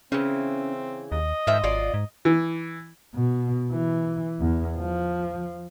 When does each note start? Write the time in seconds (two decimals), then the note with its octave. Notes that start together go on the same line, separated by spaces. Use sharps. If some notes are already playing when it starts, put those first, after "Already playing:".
0.12 C#3 E3 C4 C#4
1.12 D#2 D#5
1.47 G#2 D#3 F3 E5
1.63 G#1 F#3 F4 D5
1.94 G#2
2.25 E3
3.15 B2
3.72 E3
4.40 E2
4.77 F3